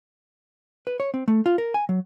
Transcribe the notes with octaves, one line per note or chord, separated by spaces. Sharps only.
B4
C#5
C4
A3
F4
A#4
G#5
F#3